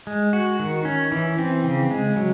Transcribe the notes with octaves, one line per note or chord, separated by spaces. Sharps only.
G#3
F#4
D#3
C#4
E3
C4
C#3
G#3
F#3